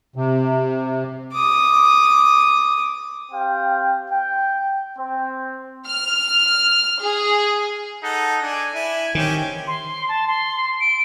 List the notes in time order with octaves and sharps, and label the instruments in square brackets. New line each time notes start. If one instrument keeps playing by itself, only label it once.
[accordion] C3
[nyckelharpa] D6 D#6
[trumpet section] C4 G4 F5 G5
G5
C4
[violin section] F6
G#4
[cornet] D#4 [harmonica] A4 F#5
[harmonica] D4 D5 [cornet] G#5
[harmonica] E4
[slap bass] D#3 [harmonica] C4 C#4 G4
[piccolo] C6
A5
C6
D7